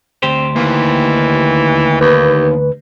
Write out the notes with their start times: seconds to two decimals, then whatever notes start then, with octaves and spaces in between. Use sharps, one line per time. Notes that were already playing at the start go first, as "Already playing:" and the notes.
0.23 D2 C4 G4 C5
0.56 D#3 E3 A#3
2.01 D#2 B4